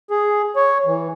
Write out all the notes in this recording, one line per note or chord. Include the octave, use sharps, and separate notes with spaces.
G#4
C#5
E3